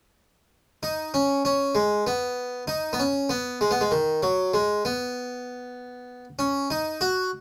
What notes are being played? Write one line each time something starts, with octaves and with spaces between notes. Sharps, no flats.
D#4
C#4
C#4
G#3
B3
D#4
B3
C#4
B3
G#3
B3
G#3
D#3
F#3
G#3
B3
C#4
D#4
F#4